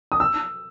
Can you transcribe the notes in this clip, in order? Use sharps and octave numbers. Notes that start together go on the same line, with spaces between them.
D#6
E6